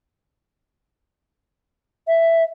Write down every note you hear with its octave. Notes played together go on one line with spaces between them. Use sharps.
E5